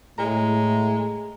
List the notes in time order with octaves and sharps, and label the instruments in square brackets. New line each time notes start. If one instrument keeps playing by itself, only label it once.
[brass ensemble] A2 [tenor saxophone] G#3 [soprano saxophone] A#5